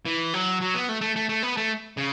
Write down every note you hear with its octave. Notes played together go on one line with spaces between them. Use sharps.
E3
F#3
F#3
B3
A3
A3
A3
A3
B3
A3
C#3